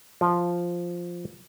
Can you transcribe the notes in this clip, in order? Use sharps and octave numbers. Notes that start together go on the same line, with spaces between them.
F3